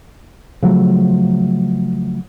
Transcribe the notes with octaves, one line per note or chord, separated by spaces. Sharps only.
C#3 F3 F#3 A3